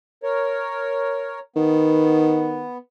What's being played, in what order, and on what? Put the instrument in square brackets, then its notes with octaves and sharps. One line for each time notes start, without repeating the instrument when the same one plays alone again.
[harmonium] A#4 C#5
[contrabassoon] D#3 [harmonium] B3